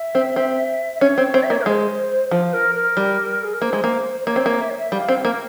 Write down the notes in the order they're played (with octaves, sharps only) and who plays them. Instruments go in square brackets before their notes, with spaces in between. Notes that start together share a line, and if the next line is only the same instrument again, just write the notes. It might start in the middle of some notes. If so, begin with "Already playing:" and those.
Already playing: [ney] E5
[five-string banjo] C4
C4
[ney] E5
[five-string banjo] C#4 [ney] C#5
[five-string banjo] C4
[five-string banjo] C4 [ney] C#5
[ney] E5
[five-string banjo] A#3 [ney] C#5
[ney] A#4
[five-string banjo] G#3 [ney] C5
[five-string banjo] F3 [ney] C5
[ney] A#4
A#4
[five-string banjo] G3
[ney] G#4
A#4
[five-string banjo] A#3 [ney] C5
[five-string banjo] G#3
A#3
[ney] C5
[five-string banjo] A#3 [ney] C#5
[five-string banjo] C4
A#3
[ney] E5
C#5
E5
[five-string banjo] G3 [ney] F5
[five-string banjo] C4
[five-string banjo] A#3 [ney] A#4